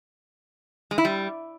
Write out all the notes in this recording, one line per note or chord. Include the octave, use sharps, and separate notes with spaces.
G#3
E4
G3